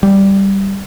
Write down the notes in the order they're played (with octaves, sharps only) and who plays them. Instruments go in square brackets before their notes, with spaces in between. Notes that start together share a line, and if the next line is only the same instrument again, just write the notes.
[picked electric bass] G3